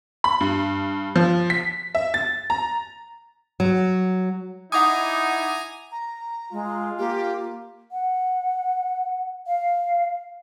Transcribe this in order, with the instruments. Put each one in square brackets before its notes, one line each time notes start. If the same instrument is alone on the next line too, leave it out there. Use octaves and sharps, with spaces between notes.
[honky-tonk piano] B5
G2
F3
B6
E5
A6
A#5
[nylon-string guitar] F#3
[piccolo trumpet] D#4 [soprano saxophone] E4 [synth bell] F#5 D6 D#6 [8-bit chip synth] G#5 A#5
[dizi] A#5
[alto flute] G#3 [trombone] F4
[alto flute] A#3 [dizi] G4
[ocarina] F#5
F5